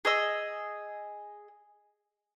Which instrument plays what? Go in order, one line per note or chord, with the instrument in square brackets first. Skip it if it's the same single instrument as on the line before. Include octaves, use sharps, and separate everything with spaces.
[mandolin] G#4 D#5 E6